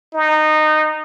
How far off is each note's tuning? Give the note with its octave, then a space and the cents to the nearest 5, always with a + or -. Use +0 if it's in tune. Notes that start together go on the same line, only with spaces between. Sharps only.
D#4 -20